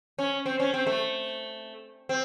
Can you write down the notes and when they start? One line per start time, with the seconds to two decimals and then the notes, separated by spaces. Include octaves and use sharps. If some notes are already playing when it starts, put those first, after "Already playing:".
0.19 C#4
0.46 C4
0.60 C#4
0.74 C4
0.87 A3
2.09 C4